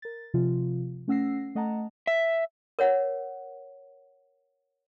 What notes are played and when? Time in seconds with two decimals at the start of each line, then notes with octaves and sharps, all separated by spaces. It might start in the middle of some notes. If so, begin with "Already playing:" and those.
0.02 A#4 A6
0.34 C3 F3 F4
1.08 A3 C#4 F#5 E6 A#6 C7
1.55 A3 D#5 F#5 A5 A#5
2.07 E5
2.79 A#4 C#5 F#5